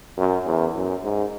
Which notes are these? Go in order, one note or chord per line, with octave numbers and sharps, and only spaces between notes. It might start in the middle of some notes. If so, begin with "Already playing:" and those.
F#2
E2
F#2
G#2